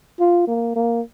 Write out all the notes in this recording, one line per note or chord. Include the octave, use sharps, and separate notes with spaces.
F4
A#3
A#3